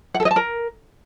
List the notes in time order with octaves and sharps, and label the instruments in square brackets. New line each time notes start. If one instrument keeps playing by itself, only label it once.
[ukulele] F#5
A4
D#5
A5
A#4